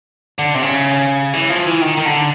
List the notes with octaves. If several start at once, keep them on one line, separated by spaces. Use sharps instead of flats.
D3
C3
C#3
E3
F3
E3
D#3
D#3
D3